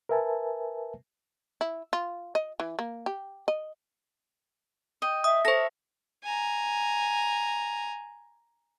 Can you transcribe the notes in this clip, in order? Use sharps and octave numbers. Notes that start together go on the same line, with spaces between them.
A#4 B4 E5 G#5 A5
E4
F4
D#5
E3
A#3
G4
D#5
D#5 G5
E5 D#6
A4 C5 C#5 A#6
G#5 A#5